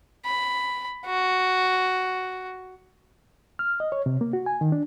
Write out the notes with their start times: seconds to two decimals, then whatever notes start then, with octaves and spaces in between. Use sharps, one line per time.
0.25 B5
1.06 F#4
3.59 F6
3.80 D#5
3.92 C#5
4.06 C3
4.21 A#3
4.33 F#4
4.46 G#5
4.61 D#3
4.72 D4